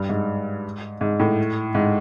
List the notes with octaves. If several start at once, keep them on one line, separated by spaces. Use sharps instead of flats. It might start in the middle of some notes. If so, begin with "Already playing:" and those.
Already playing: G2
G#2
G#2
A2
G#2